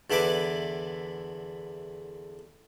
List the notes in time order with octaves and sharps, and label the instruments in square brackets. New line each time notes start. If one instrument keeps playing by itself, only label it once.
[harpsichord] E2 D3 E4 B4 D6